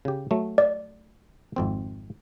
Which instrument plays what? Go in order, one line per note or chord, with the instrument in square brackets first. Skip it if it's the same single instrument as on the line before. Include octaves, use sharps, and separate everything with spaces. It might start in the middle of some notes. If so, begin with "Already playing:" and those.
[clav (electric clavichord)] C#3 G4
F#3 A3
[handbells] D5
[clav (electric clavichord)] G#1 F2 C4